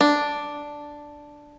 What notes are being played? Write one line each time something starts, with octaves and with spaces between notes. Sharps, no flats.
D4